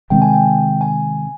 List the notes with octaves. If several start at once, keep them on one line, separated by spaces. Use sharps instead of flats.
C3 D#3 G#3 C4 G5
G#5
G5
G#5